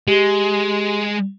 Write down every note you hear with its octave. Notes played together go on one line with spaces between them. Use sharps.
G#3 G4 F#7 G7